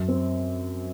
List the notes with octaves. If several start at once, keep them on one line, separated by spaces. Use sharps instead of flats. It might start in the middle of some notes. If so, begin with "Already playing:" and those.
Already playing: F#2
C4